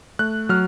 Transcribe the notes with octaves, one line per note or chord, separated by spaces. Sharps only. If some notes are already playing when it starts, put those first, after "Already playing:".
A3 F#6
F#3 F6